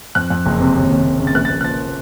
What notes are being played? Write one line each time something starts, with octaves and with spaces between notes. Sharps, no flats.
F2 F#6
F2
F#1
C3
D#2
D#2
D#2
C#3
A6
A#1 F#6
A6
A#1
F#6
F3 A6